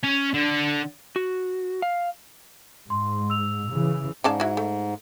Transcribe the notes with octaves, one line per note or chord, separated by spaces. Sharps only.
C#4
D3
F#4
F5
G#2 C6
E6 F7
C#3 E3
G#2 C#3 D5 A5
E4 F#4
A3